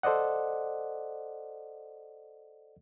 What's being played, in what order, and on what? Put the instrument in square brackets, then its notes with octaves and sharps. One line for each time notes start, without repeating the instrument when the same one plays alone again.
[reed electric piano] A4 C5 D5 D#5 F#5